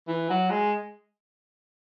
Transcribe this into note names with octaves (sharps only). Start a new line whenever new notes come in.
E3
F#3
G#3